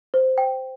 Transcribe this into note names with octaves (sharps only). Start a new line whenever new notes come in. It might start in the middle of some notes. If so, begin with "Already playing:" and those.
C5
G5